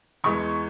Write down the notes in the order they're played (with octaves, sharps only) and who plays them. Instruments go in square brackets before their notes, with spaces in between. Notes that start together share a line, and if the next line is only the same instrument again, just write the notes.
[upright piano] E2 E3 G#3 C#6